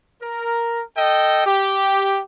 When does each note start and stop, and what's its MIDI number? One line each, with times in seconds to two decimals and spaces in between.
0.21 0.83 70
0.97 1.43 69
0.97 1.43 75
0.97 1.43 79
1.46 2.21 67